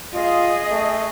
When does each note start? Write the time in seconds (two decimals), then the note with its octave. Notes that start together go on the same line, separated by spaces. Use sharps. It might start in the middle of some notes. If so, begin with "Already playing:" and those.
0.14 F4 G#4 D#5
0.71 A3